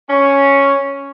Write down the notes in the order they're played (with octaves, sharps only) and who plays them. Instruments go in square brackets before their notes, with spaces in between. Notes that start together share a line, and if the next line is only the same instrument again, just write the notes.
[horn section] C#4